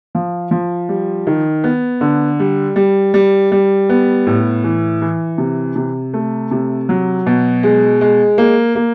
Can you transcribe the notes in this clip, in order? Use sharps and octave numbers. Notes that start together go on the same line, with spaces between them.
F3
F3
G3
D#3
B3
D3
G3
G3
G3
G3
B3
A2
E3
E3
C3
C3
A3
C3
F#3
B2
G#3
G#3
A#3
A#3